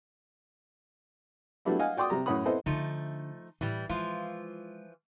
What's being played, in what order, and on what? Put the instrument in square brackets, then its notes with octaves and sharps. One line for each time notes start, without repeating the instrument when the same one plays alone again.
[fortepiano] F#3 G3 A3 B3 D4 E4
D#5 F5 F#5 G#5
F#4 D5 G5 C6 D6 D#6
C3 G3 A#5
F#2 A2 C#5 F#5 B5 D#6
B3 C4 E4 A4 C5 D#5
[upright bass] D3 D4 [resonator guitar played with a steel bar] F3 A3 D#4
[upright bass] A2 [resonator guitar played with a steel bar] E3 G3
[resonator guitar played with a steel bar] E3 F3 F4 [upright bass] G#3